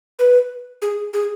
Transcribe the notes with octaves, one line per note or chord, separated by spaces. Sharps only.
B4
G#4
G#4